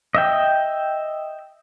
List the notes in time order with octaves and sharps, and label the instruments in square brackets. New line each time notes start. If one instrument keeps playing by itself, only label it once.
[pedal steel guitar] D#5 E5 G5